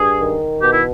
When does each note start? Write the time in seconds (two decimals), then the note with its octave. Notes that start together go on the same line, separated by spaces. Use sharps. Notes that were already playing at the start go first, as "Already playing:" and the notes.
Already playing: G2 G#4
0.20 D#3
0.63 B2 G4
0.72 E4